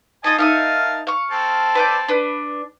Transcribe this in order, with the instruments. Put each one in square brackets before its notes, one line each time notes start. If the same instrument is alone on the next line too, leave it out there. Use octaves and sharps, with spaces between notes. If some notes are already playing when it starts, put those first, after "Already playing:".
[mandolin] D#4 F4 [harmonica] D#5 G#5 A5
[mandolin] D#4 E5 D#6 [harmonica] A#4 F5 A5
[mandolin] F5 C#6
[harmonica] C4 A4 A5
[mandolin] B4 D5 G6
D4 B4